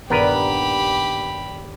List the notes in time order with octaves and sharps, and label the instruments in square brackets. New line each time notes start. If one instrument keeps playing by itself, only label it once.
[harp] D#1 G2 [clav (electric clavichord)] B3 A#4 B4 [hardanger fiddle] G4 B5